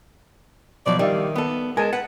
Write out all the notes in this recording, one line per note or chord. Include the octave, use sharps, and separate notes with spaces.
B2 F3 F#3 D5
D#3 G3 D5 E5 F5
B3 A4
G#3 A#4 G#5 A5
B4 F#5